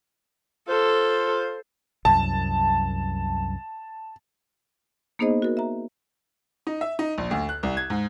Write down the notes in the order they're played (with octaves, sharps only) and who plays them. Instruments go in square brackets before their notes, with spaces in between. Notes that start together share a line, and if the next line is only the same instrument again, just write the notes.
[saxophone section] F4 C5 [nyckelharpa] A4
[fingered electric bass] C2 F#2 [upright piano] A5
[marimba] A#3 B3 D#4 G#4 C5 D#5
F#4 A#4
E5 A#5
[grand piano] D#4
E5
D#4
A#1
D2
F#6
C2
G#6
G#2